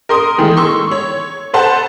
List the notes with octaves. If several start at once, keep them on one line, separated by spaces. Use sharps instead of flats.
A#4 C6 D#6
D#3 E3 G#3 A3
C6 C#6 E6
C#5
A4 B4 C5 F#5 A5 C6